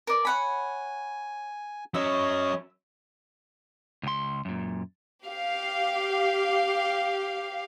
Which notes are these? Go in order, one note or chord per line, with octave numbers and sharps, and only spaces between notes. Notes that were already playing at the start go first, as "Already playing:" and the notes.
A#4 D5
C#5 F#5 G#5 B5
F#3 C#4 C#5 D#5 E5
C#2 C6
F#2 A#2
G4 F5